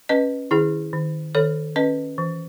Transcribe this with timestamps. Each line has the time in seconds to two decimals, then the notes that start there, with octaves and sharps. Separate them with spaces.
0.09 C#4 B4 D#5
0.51 D#3 E4 G#4
0.93 D#3
1.35 D#3 A4 C#5
1.76 C#4 B4 D#5
2.18 E3